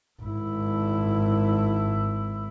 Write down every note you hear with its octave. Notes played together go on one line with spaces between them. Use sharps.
G#1 E4